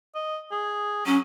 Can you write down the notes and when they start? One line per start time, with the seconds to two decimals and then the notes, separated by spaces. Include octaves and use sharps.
0.15 D#5
0.52 G#4
1.06 F#3 C#4